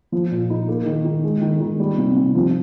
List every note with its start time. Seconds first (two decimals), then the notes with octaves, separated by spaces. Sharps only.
0.12 F3
0.31 A#2
0.50 D#4
0.68 A#3
0.86 D#3
1.05 D#3
1.24 G#3
1.41 D#3
1.60 D#3
1.80 G3
1.98 C3
2.16 C3
2.35 F3